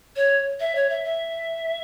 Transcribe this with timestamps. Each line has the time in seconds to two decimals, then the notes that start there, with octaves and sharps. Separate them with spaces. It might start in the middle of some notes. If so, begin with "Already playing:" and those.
0.16 C#5
0.60 E5
0.75 C#5
0.90 E5
1.04 E5